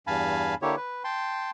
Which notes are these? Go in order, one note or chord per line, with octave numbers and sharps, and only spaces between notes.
E2 G2 F5 G#5 A5 B5
D3 A#3 E4 G4 C#5
B4
G5 A5 C6